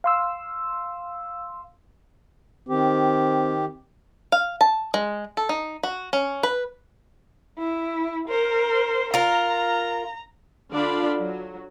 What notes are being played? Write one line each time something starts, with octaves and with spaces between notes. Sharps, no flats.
F5 C6 E6
D#3 C4 G4
F5
A5
G#3
A4
D#4
F#4
C#4
B4
E4
A#4 C5
F4 A#4 A#5
D3 D4 F4 D5 F5 B5
F#3